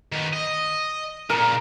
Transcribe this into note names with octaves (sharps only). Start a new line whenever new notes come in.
D#3 B3
D#5
A#2 C#3 A#4